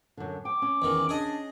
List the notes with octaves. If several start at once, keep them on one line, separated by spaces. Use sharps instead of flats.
F#2 D3
G5 D6
C#4
E2 D#3
D4 G#4 D#5